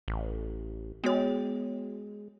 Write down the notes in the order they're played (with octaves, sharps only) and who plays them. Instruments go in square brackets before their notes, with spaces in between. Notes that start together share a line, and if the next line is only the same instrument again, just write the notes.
[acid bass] A1
[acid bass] G#3 [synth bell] B3 F#4 C#5